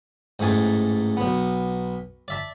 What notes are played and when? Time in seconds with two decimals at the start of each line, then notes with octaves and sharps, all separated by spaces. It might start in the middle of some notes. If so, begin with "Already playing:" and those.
0.39 A1 G#2 A3 G#5 A5
1.17 B1 B3
2.28 D5 E5 A5